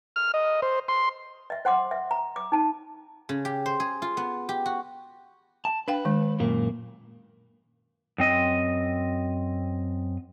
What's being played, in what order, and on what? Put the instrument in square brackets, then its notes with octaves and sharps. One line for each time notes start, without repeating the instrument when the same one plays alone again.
[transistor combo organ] F6
D#5
C5
C6
[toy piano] D#5 E5
C5 F#5 C6 D6
E5
A#5
D6
D#4 A5
[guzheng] C#3
G4
C5
G#4
F4
B3
G4
F#4
[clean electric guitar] A5
[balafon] D4 F5 G5 [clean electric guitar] B4
[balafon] D#3 G#3
[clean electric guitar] F#2 A#2 A#3
[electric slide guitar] F#2 C4 D#5